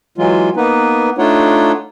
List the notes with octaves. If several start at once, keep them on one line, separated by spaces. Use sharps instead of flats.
E3 F#3 G#3 F4
A#3 B3 D#4 B4
A3 D4 D#4 F4 C#5 F#5